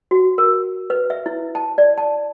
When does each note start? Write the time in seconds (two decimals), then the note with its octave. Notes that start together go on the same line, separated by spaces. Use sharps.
0.11 F#4
0.38 A#4
0.90 B4
1.10 E5
1.26 E4
1.55 A5
1.78 D5
1.98 A5